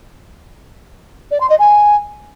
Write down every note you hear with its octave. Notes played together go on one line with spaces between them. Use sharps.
D5
C6
D#5
G#5